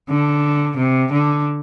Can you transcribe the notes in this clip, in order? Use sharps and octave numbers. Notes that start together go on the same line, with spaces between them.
D3
C3
D3